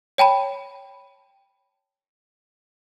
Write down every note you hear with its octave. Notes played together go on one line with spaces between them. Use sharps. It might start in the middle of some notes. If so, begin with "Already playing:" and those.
C#5 G5 A5 B5